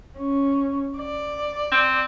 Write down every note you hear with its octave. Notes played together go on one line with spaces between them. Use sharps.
C#4
D5
C4